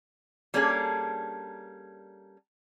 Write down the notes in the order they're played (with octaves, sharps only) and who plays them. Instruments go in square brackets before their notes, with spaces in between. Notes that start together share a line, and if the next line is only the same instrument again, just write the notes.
[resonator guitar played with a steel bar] G3 A#3 C#4 D4 G#4 A4